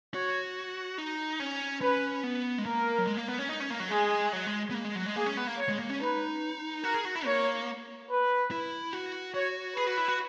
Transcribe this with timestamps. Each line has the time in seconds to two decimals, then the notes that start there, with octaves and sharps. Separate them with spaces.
0.14 F#4 C#5
0.98 D#4
1.40 C#4
1.81 C#4 B4
2.23 B3
2.58 G#3
2.65 A#3 A#4
2.98 F#3
3.07 G#3
3.17 A#3
3.28 B3
3.39 C#4
3.49 D#4
3.60 C#4
3.70 A#3
3.80 F#3
3.90 G#3 G#4
4.33 F#3
4.47 G#3
4.71 B3
4.74 A#3
4.84 G#3
4.95 F#3
5.06 G#3
5.16 A#3 G#4
5.26 C#4
5.37 B3
5.47 A#3
5.58 C#5
5.69 G#3
5.79 A#3
5.90 C#4
6.00 D#4 B4
6.84 F#4 A#4
6.94 G#4
7.05 F#4
7.15 E4
7.25 A#3 C#5
8.10 B4
8.51 E4
8.93 F#4
9.34 F#4 C#5
9.77 G#4 B4
9.87 F#4
9.98 E4
10.08 F#4